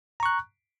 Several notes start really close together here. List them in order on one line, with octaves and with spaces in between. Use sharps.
A#5 C#6 F#6